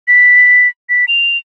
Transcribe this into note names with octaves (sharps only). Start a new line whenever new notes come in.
B6
B6
F7